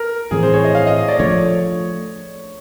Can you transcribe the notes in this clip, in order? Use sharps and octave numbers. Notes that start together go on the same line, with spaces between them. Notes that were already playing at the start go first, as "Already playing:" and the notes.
Already playing: A#4
A2 E3 A3 C4 G#4
C5
C#5
D#5
F5
D#5
D#5
D5
F3 A3 D4 C#5